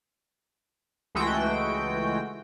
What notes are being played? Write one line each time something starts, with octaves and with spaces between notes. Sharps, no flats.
C#2 E3 G#3 A3 F#4 G5